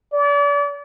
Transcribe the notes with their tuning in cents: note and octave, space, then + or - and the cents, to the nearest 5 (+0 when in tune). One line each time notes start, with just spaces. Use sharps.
D5 -35